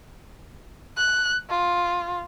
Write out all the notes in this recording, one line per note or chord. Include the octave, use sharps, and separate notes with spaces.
F#6
F4